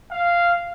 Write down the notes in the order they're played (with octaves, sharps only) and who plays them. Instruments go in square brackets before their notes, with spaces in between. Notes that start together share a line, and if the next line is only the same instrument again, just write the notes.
[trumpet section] F5